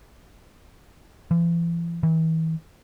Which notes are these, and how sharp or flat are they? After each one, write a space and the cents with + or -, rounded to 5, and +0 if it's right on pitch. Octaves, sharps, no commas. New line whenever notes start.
E3 +45
E3 -40